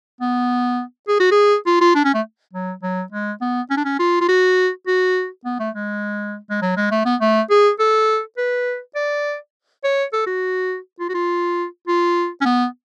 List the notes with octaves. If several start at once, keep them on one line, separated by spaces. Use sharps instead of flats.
B3
G#4
F#4
G#4
F4
F4
D4
C#4
A3
F#3
F#3
G#3
B3
C#4
D4
C#4
F4
F4
F#4
F#4
B3
A3
G#3
G#3
F#3
G#3
A3
B3
A3
G#4
A4
B4
D5
C#5
A4
F#4
F4
F#4
F4
F4
C#4
B3